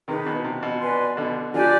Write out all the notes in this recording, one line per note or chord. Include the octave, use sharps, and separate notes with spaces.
C3 D#3 D#4 G#4 B4
B2
C3
B2
B4 D5 G#5 C6
B2 D3
D3 F3 D4 G4 D5 G#5